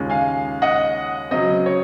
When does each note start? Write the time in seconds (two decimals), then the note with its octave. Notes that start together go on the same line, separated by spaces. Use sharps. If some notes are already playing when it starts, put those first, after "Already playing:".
Already playing: D#2 C#3 G#3 C#4 F4
0.10 F5 G#5
0.62 D#5 F#5
1.31 C#3 F#3 C4 D#5
1.66 C#5